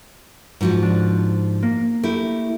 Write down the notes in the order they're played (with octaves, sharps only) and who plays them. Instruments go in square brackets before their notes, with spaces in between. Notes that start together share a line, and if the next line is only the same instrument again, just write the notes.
[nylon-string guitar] G#2 F3 F#4
[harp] D4
A#3
[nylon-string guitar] A3 E4 [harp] G4